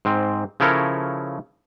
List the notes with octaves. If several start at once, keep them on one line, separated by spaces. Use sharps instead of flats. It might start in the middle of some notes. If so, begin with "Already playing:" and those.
G#2 C4
C#3 F3 E4 A4 A#4 C#5